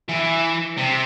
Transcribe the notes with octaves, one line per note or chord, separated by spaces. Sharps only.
E3
C3